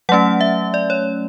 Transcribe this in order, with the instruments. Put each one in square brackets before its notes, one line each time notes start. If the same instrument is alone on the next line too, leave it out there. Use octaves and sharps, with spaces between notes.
[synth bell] F#3 A3 C#4 F#5
E5
D5
C#5